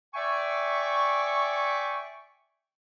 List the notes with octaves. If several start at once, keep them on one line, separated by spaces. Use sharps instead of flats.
D5 E5 G5 G#5 C#6